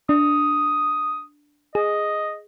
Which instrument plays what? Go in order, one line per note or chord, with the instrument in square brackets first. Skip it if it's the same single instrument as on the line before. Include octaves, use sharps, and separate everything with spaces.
[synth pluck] D4 [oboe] D#6
[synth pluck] G#4 [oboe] D#5